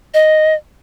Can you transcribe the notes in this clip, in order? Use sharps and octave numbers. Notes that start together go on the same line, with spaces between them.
D#5